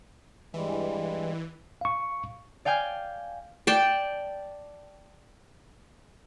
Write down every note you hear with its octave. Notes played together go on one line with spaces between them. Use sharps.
G2 E3 G3 G#3
F5 C#6
D5 F5 G5 G#5 F6
D5 G5 A5